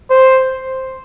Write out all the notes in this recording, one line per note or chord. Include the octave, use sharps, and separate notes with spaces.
C5